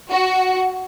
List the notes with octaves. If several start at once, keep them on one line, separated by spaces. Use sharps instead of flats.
F#4